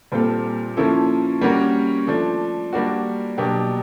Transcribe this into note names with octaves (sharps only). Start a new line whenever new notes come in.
A#2 G3 C4 F4 A4
F3 A#3 C#4 E4 A4
G3 A#3 C#4 F#4 A#4
F3 A3 D4
G3 A#3 D4 F#4
B2 F#3 A#3 D4 G4